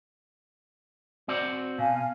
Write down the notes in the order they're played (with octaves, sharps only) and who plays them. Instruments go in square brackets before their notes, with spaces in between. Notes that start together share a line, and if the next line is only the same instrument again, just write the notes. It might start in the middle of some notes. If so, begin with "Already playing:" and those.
[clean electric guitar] C4 F#4 D5
[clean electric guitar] B2 [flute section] F5 G#5